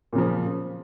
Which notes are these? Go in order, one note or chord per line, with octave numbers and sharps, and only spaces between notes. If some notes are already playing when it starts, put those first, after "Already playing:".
A#2 C#3 F3